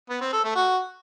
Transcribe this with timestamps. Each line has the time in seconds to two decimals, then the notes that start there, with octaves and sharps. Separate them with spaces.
0.10 B3
0.21 C4
0.32 A4
0.44 A3
0.55 F#4